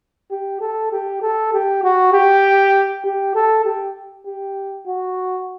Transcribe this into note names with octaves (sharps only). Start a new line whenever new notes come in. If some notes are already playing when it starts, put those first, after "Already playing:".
G4
A4
G4
A4
G4
F#4
G4
G4
A4
G4
G4
F#4